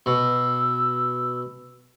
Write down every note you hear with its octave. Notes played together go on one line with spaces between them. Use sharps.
B2 E6